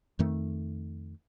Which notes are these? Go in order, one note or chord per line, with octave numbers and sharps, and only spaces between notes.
F2 D#3 A3